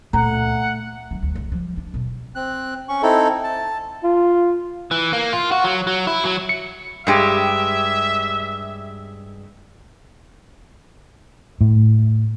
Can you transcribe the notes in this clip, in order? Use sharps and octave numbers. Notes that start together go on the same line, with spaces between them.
C#2 A#2 A3 F#5 A#5
F#3 C#4
D2
C#2 F3
F3 G3
D4
D#1 B2
C4 F#6
C#4 C#6
C4 D#4 E4 A4
A5
F4
E3
A#3
F4
F#4
F#3
F#3
E4
F#3
C#7
G2 G#3 G4 E5
A2